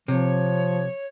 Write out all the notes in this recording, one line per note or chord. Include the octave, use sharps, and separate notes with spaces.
C3 F3 C#5